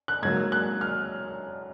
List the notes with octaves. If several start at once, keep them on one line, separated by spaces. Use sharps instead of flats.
F#6
G#2 F#3 A#3 G#6
F#6
F6